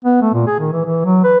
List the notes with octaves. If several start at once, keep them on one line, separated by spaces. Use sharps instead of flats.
B3
A3
A#2
G#4
D#3
E3
E3
F#3
B4